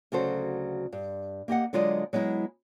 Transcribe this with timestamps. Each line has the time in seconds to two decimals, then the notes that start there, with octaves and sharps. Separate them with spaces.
0.12 D2 C#3 F#3 F#4 A4 C5
0.92 G2
1.48 A#3 G4 D#5 F#5
1.73 D3 F#3 G#3 F4 D5 D#5
2.13 F#3 G#3 B3 E4